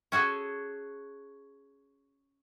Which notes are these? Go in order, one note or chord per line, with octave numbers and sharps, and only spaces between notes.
C#4 F#4 G#4 A4